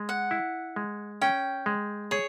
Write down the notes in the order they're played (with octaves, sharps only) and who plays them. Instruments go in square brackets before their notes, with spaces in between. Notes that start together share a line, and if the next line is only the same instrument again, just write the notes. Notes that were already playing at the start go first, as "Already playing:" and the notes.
Already playing: [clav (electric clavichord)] G#3
[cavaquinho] F#5
[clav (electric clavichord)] E4
G#3
[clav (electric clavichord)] C#4 [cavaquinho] G5
[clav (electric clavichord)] G#3
[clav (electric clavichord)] G#4 [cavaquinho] C#5